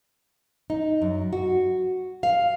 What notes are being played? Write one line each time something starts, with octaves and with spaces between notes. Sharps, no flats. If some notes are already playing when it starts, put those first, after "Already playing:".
D#4
F#2
F#4
F5